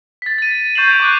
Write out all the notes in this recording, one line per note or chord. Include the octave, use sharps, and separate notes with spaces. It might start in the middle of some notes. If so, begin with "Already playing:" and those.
A6 B6
A6 D#7
C#6 G6 A6 C7 E7 F#7
G6 G#6 D7 F7
C#6 D6 F#6